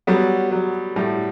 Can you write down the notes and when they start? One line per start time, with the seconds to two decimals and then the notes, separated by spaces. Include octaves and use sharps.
0.07 F#3 G3 B3
0.51 F#3
0.96 A2 G3